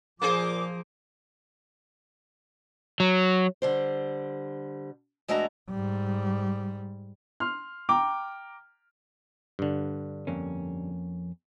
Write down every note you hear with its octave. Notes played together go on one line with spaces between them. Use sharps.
A#2 F3 A#3 G#4 C5 D6
F#3
D3 G3 C5
E2 G#3 A3 D4 F#4 A#5
G#2 G3
C6 F6
G5 A#5 D6
G2 D3
F2 A#3 C#4